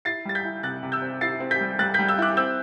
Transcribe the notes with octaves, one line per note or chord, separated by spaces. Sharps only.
E4 A6 C7
G3 A6
G6 B6
E4
C3 F#6 A6
C3
E6 G6
C4
E4 A6 C7
C4
G6 B6
G3
G3 F#6 A6
G3 G6 B6
E6 G6
E4 D6 F#6
C4 E6 G6